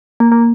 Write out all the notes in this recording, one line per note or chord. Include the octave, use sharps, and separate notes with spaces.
A#3
A#3